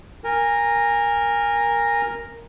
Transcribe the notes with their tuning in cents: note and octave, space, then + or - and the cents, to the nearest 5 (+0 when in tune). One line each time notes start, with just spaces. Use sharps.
A#4 +0 G#5 -25